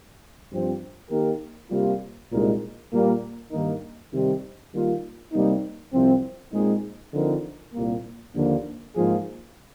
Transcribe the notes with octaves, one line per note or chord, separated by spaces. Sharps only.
G2 F3 C4
D#3 A#3 D#4 G4 A#4
C3 G3 A#3 F4
C2 A#2 G#3 D#4 A#4
A#2 G3 A#3
G2 D#3 A#3 D#4 A#4
C3 D#3 G3 C4 D#4
D#3 G3 A#3 F4
C3 G3 A#3 D#4
C2 C3 F3 C4
A#2 G#3 C4 D#4 G#4
D3 F3 C4 D#4 A#4
C2 A#2 G3 A#3
D#2 D3 F3 A#3 D4
G#2 F3 A#3 F4 G#4